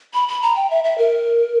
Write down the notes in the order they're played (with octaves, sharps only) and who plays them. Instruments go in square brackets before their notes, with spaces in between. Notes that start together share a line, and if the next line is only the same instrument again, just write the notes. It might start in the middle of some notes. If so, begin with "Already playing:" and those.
[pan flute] B5
B5
A#5
G5
E5
E5
A#4